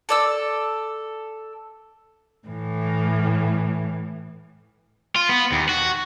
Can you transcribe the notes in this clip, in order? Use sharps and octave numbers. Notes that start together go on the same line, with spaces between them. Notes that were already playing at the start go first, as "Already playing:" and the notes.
A4 D5 E6
A2 E3
F4
B3
D#2
F#4